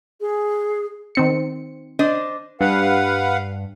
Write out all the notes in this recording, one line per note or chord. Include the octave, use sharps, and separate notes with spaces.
G#4
D#3 C4 C#7
D4 C5 D#5
G2 B4 F5 F#5